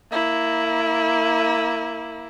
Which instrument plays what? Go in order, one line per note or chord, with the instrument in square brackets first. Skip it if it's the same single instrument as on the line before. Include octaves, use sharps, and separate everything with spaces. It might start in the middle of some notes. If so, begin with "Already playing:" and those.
[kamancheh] A#3 E4